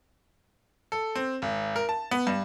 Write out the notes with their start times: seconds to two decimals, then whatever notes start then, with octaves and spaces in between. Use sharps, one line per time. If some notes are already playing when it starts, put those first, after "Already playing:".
0.92 A4
1.15 C4
1.42 G#1
1.76 A#4
1.89 A5
2.11 B3
2.27 G2